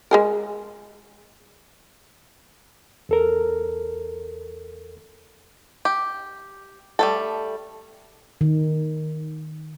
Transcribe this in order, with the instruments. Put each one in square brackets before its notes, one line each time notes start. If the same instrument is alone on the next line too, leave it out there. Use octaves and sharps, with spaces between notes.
[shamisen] G#3 G#4 A#4
[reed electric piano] E2 A4 A#4
[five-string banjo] G4
G3 A3 A4
[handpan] D#3